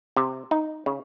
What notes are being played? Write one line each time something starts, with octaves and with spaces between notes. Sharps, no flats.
C3
D#4
C#3